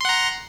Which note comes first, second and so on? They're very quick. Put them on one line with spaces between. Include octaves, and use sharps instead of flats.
C6 F#5 A#5